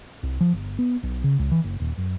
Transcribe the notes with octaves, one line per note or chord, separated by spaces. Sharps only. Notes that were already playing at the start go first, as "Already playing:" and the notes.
C2
F3
G1
B3
B1
C#3
C#2
E3
F#1
D#1
F#2